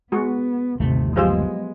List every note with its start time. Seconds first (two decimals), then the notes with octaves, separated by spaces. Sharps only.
0.12 G#3 B3 F#4
0.80 G1 D#2 C3 A3
1.16 F3 F#3 G#3 B3 G4 G#4 C5 F5